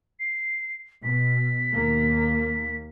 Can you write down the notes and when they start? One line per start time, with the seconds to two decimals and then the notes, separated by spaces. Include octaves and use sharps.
0.19 C7
1.03 B2 B6
1.73 D#2 A#3